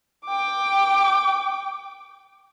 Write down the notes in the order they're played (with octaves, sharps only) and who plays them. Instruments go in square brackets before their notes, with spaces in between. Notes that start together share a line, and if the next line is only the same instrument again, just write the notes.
[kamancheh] G5 D6